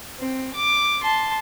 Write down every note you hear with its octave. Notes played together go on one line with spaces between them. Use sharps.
C4
D6
A5 C6